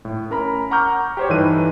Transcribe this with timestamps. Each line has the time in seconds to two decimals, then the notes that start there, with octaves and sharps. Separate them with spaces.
0.05 A2
0.30 C#4 A#4 A#5 B5
0.71 F#5 A#5 C#6 D6 F6 G6
1.17 G4 C5 C#5
1.29 G2 E3 D#4 A4 F#6 D#7